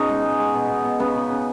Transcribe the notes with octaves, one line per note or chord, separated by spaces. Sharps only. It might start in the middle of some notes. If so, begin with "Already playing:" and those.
Already playing: B2 C#4 D#4 F#4 G#4 D#5 F#5
G#3
G#3
G#3
B2
B2
B2
C#3 B3 B4
C#3
C#3